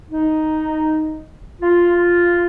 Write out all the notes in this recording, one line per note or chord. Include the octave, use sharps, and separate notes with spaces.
D#4
F4